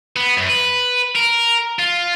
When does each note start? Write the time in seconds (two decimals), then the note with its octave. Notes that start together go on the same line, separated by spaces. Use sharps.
0.16 B3
0.38 F#2
0.49 B4
1.15 A#4
1.79 F4